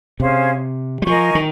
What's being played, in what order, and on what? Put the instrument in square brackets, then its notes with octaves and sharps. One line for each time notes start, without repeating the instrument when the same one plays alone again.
[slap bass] C3 [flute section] C#4 G#4 C5 F5
[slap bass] G3
[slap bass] F3 [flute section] A#4 D#5 G#5 C#6
[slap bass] D#3